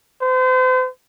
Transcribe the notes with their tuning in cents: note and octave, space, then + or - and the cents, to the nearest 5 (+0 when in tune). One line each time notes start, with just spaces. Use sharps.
C5 -40